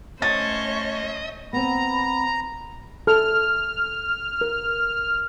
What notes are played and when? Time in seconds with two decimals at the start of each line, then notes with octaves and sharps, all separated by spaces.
0.22 A3 C#4 C5 C#5 D#5 A6
1.53 B3 C4 A#5 B5
3.07 A4 F6
4.41 A#4